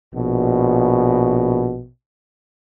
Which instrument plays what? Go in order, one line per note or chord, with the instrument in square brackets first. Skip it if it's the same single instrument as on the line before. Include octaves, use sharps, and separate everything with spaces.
[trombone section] A#1 B2